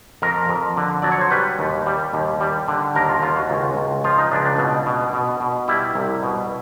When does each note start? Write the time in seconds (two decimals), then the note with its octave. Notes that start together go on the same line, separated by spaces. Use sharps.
0.22 F2 A#4
0.49 F2
0.77 D3
1.02 F#3 D5
1.12 C#5
1.21 C5
1.31 G3 B4
1.59 D#2
1.86 G3
2.13 D#2
2.40 G3
2.68 D3
2.95 D#2 A#4
3.09 F4
3.22 D#2 F4
3.36 F#4
3.50 C#2
3.77 C#2
4.04 F3 F4
4.18 D#4
4.32 C#2 D4
4.45 D4
4.58 B2
4.86 B2
5.13 B2
5.40 B2
5.68 G3 E4
5.95 C2
6.23 B2